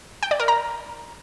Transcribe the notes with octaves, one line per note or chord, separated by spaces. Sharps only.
G5
D5
A#4
A#5